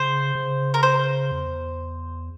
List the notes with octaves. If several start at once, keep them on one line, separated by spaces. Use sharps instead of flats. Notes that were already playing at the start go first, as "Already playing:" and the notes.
Already playing: C#3 C5
C#3
A#4
C5
E2